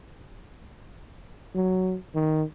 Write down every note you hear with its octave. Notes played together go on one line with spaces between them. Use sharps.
F#3
D#3